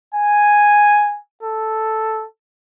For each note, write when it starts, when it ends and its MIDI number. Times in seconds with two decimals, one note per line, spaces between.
0.15 1.18 80
1.43 2.25 69